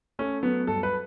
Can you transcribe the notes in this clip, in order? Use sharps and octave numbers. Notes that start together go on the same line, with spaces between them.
A3 C#4
F#3 B3
G2 A4
B4